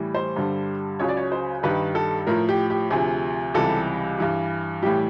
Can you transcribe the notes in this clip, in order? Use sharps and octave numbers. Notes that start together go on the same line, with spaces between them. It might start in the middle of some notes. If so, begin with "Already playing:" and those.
Already playing: A2 E3 G3
C5
G2 D3 G3
C#2 C#3 F#3 C#5
D5
C#5
C5
G2 D#3 G3 B4
A4
A2 F3 A#4
G4
G4
D2 C3 F3 G#4
C#2 C3 E3 G3 A4
G2 E3 G3
A2 E3 G3 G4